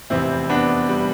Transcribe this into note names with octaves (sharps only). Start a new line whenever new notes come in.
F1 E2 C3 C4 E4
B3 D4
C3 G3